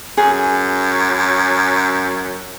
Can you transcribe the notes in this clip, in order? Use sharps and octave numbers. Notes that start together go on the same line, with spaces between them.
F#2 G#4